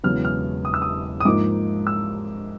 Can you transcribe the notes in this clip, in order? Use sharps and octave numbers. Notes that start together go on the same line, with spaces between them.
E1 E2 C#3 F#3 B3 F6
F6
D#6
E6
D#6
D#6
G#2 F3 A#3 D#4 D6
E6